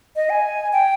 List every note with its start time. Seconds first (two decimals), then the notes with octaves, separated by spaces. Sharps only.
0.16 D#5
0.30 G#5
0.73 G5